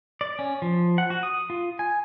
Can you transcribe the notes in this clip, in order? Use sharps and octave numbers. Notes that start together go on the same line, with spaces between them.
D5
C#4
F3
F#5
F#4
D#6
F4
G#5